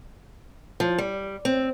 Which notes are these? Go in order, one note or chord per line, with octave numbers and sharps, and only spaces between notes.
F3
G3
C4